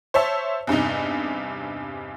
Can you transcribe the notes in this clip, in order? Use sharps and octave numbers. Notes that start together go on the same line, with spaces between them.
C5 C#5 E5 A5
E2 G2 C3 D#4